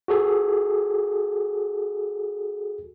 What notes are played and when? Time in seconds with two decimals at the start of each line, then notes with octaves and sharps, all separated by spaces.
0.08 F#4 G#4 A4